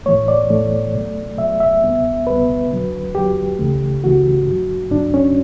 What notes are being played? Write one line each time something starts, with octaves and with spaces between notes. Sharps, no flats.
A2 E3 A3 C#5
D5
A2 E3 A3
B2 F#3 A3
B2 F#3 A3 E5
E5
C#2 B2 G3 B3
C#2 B2 G3 B3 B4
E2 D3 F#3
E2 D3 F#3 G4
C#2 C#3 E3 A3
C#2 C#3 E3 A3 F#4
G2 D3 F#3
G2 D3 F#3 D4
C#4